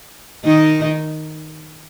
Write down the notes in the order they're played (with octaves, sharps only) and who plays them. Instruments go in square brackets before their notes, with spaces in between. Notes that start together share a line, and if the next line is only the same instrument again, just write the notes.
[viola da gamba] D#3 D#4